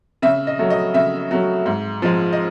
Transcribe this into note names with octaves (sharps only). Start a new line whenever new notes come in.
C#3 E5
D#5
F#3 A3
D#5
C#3 E5
F#3 A3
G#2
F3 G#3
D#5